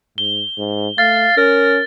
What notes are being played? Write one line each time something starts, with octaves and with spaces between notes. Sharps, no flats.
G#2 G7
G#2
A3 F5 A6
C#4 A#4